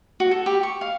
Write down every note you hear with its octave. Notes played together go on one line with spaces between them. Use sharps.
F#4
A4
G4
C#6
F5